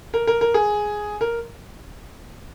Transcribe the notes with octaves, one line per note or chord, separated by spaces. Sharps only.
A#4
A#4
A#4
G#4
A#4